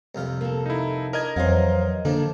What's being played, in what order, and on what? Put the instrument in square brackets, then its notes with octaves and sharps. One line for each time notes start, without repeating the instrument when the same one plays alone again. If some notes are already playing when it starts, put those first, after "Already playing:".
[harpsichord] C2 F2 F4
[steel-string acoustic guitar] A#3 A4
[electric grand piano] D#4 E4
[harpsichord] D4 [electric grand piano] A#4 D#5 G#6
[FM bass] F2 [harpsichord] E3 F#3 [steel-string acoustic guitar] C5 F5
[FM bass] D3 [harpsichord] F3 D4 [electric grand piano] A#3 [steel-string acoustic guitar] A4